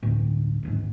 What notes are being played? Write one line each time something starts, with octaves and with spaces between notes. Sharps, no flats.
G1 D2 A2
D1 G#1 G#2